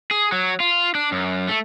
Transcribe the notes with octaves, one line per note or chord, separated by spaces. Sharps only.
G#4
F#3
F4
D4
F#2
A3